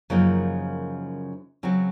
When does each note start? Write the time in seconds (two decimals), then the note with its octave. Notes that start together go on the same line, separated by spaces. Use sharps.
0.10 F#2 C#3 F3 A#3 D#4
1.63 C#3 F#3 C4 F#4